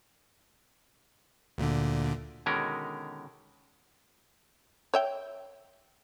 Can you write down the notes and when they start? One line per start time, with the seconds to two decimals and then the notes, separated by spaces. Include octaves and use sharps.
1.58 D2 A#2 D3
2.46 B2 D3 D#3 G#3 C#4 A#4
4.94 C#5 E5 G5